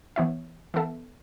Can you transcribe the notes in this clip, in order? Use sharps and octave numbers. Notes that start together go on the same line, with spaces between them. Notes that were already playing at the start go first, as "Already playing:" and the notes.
E3 B3 E4 C#5 E5
E3 B3 A4 E5